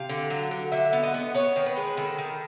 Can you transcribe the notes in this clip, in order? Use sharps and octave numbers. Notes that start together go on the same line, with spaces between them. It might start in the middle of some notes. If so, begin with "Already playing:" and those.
Already playing: C3 F5
D3
F#3
D3
D3 E5
B3
D#5
B3
B3 C#5
D#3
B4
G#3
D#3 A4
D#3